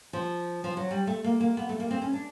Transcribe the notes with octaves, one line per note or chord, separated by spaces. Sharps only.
F3
F3
F#3
G3
A3
A#3
A#3
B3
A3
A#3
C4
C#4
D4